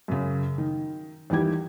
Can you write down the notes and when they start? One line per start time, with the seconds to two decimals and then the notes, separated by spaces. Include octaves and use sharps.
0.08 F#2 C#3
0.58 D#3
1.30 E2 D#3 E3 G3 G4 G#6